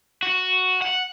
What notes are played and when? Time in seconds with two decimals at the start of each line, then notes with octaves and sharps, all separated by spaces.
0.23 F#4
0.82 F#5